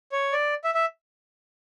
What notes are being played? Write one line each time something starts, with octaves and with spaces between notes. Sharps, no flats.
C#5
D5
E5
E5